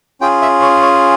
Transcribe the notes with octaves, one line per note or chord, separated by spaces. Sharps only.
C#4 F4 G#4 G5
E5
C#5
C#5